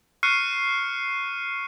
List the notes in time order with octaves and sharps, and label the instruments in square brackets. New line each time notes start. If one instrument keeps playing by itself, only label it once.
[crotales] C#6 F6 F#6 C7 C#7 D#7